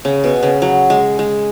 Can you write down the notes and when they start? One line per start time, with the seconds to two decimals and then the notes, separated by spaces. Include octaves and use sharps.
0.05 C#3
0.24 B2
0.43 C#3
0.62 F#3
0.90 G#3
1.19 G#3